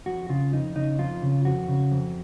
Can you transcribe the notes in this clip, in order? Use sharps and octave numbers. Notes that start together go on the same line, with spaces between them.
F2 F#4
C#3 F4
F2 D#4
C#3 D#4
F2 F4
C#3
F2 F#4
C#3
F2